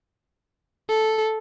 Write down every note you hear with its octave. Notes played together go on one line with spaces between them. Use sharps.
A4